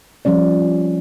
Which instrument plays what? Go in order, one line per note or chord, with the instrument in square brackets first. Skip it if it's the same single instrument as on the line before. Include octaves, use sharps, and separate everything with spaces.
[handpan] F3 G3 C#4 D5